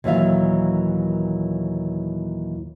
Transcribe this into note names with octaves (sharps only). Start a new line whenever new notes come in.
D#2 A#2 E3 F#3 E5 F5